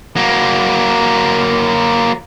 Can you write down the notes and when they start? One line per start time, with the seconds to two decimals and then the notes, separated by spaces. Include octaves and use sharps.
0.16 F#3 A#3